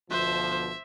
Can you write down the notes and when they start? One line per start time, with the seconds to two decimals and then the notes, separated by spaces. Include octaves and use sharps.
0.11 D2 B2 F3 C5 E5